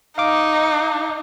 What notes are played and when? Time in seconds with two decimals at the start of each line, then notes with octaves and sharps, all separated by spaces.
0.18 D#4 F5 D6